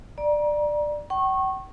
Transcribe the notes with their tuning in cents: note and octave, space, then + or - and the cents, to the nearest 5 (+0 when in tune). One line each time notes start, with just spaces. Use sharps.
D5 +15 A#5 +30
G5 -45 C#6 -25